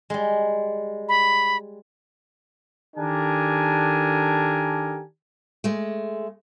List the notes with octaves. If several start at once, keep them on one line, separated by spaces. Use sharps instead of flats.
G3 G#3
B5
D#3 D4 G4 A4 A#4 G#5
G#3 A3